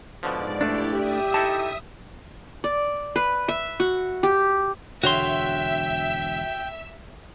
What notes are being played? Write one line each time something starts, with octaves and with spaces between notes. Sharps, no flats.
G#2 B2 D3 F3 D5
A3 D4 E4 G4 D5
G4 E5 D#6
D#4 E4 A4 A5
D5
B4
E5
F#4
G4
E1 D3 F#4 C#5 E5 G5 C6